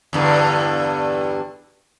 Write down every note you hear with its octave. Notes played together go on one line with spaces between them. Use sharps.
E2 G2 D3